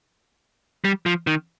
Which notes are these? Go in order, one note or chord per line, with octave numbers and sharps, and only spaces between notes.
G3
F3
D#3